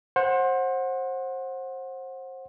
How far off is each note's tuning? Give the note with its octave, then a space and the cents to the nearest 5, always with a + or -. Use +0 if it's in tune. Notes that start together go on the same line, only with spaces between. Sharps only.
C5 +25 F#5 -15